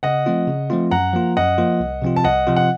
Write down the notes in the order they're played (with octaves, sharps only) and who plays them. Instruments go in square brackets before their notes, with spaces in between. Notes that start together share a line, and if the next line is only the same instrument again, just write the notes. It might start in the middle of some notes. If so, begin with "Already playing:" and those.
[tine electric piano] C#3 [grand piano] D#5 F#5
[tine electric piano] F3 A3 C4 F4
C#3
F3 A3 C4 F4
[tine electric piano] F#2 [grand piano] F#5 A#5
[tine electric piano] F3 A#3 F4
[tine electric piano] F#2 [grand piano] D#5 F#5
[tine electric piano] F3 A#3 F4
C2
C3 F3 C4 F4
[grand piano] A5
[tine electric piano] C2 [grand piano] D#5 F#5
[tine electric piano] C3 F3 C4 F4
[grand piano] F#5